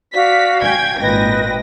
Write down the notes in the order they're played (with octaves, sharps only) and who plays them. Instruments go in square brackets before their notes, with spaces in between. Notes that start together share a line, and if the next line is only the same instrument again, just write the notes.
[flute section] F#4 D5 F5 [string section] B6
[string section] G5 G#5 G#6
[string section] G#1 A#2 A#6 [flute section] B4 D#5 G5